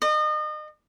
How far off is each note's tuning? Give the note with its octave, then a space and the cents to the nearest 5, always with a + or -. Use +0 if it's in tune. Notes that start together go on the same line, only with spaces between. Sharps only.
D#5 -35